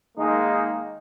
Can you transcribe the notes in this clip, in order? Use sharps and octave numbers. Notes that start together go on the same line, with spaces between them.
D#3 G#3 A#3 D#4